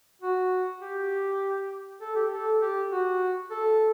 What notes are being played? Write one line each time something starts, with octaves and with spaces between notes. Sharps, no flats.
F#4
G4
A4
G4
A4
G4
F#4
A4